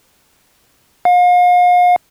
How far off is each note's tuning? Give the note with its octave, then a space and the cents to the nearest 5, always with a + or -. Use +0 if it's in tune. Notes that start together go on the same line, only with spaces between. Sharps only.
F5 +40